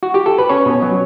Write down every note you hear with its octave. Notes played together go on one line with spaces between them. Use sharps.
F#4
G4
A4
B4
C#4 C#5
B2
F#3